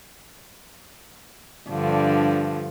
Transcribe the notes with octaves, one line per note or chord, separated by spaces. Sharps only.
G2 D3 F3